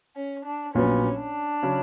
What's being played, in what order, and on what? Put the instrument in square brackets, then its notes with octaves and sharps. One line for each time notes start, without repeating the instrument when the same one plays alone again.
[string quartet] C#4
D4
[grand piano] A#1 A#2 F#3 B3 [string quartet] C#4
[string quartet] D4
[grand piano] C#3 F#3 C#4